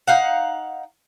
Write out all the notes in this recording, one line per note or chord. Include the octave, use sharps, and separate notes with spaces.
D#4 F5 F#5